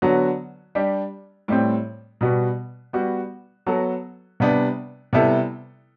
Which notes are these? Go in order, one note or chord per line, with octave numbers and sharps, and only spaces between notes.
D3 F#3 B3 F#4
G3 D4 G4
A2 G3 C4
B2 G3 B3 F#4
G3 B3 F#4
F#3 B3 F#4 A4
C3 G3 B3 D4
C3 G3 B3 E4 A4